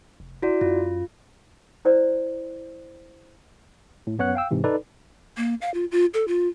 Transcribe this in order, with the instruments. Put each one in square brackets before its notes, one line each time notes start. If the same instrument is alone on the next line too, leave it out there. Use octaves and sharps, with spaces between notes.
[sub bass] F1
[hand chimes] E4 F#4 D5
[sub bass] F#2 [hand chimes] F4
[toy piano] E4 C5 D5
[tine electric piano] A2
F#2 B3 C#5 F#5 F#6
F5 G5 E6
G#2 C3 E3
D#4 A4 B4 D5
[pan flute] A#3
F5
F4
F4
A4
F4